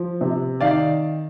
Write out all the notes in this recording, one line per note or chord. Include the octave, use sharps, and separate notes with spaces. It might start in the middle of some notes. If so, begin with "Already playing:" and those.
Already playing: F3
C3
D#3 D5 F5